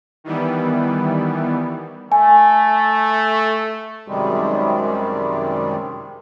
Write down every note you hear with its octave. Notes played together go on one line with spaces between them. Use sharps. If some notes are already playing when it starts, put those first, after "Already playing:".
D#3 E3 G3 B3
A3 G#5
F#2 C3 D#3 G3 G#3